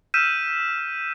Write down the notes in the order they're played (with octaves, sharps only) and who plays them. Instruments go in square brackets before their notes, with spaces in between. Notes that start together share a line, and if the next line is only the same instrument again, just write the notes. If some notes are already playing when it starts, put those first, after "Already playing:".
[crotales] E6 F6 G6 B6 D#7 E7